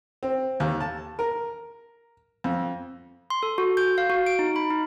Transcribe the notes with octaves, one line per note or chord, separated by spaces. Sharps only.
C4
D#2
A5
A#4
F2
C6
A4
F#4
G6
F5
F#4
D7
D#4
B5
D#4